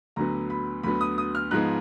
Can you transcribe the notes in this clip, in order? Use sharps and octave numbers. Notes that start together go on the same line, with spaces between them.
D2 D3 F#3 B3 A#5
B5
D2 D3 F#3 B3 B5
D#6
D#6
F6
G#2 F3 G#3 B3 F#6